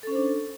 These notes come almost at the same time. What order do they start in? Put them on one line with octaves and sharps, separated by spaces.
A4 C#4 C5 D4